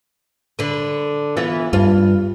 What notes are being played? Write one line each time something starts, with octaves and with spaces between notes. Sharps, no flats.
D3 B4
E3 B3 F4
G2 F4